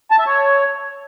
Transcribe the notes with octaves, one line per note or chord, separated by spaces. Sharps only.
A5
E5
C#5